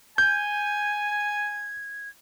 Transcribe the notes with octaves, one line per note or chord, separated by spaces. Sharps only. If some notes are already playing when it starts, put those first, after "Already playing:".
G#5 G6 G#6